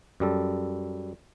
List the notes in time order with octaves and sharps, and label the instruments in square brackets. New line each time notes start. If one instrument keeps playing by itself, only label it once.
[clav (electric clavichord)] F#2 G3 A4